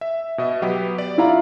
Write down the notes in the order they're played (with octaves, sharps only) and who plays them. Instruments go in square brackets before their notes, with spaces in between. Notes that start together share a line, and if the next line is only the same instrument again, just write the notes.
[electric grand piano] E5
B2 D#5 E5
F#3 B3 G4
D5
[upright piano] E4 F4 A#5